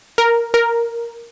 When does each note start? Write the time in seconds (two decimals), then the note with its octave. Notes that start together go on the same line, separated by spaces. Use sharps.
0.18 A#4
0.54 A#4